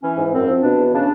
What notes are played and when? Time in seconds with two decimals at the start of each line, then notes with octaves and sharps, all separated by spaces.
0.02 E3 C#4
0.17 G#2
0.33 F#2 C4
0.47 F3
0.62 B2 D4
0.78 E2
0.93 C#3 D4